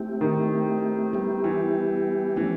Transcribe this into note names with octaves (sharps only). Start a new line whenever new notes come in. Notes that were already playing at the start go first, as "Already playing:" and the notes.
Already playing: A3 C4 E4 G4
D#3
G3 B3 E4 G4
E3
E3 F3 A3 C#4